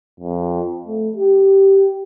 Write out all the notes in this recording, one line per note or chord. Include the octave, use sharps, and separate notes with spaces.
F2
A3
G4